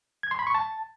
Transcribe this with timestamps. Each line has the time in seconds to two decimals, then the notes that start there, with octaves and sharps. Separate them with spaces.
0.23 G#6
0.31 C6
0.39 B5
0.47 C#6
0.55 A5